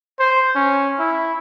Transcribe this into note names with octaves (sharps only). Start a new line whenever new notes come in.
C5
C#4
E4